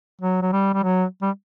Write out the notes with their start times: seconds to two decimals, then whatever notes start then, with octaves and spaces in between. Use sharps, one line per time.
0.22 F#3
0.42 F#3
0.53 G3
0.74 G3
0.84 F#3
1.22 G3